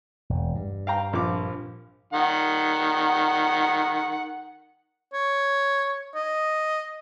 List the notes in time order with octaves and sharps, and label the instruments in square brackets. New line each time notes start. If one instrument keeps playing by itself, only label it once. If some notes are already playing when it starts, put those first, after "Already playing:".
[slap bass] E1
G2
[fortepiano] F5 G5 A#5
A#1 F3 D6
[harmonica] D#3 F#5
[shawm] C#5
D#5